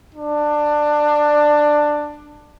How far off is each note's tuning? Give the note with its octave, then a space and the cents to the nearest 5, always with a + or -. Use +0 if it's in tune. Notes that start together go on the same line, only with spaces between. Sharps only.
D4 +15